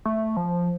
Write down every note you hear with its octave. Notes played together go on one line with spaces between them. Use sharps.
A3
F3